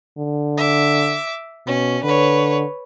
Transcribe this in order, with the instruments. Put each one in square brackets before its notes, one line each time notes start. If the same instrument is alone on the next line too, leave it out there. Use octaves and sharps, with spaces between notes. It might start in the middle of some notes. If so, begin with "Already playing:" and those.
[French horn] D3
[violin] E5 D6
[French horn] B2 [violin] C#4
[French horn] D3 [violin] B4 C#5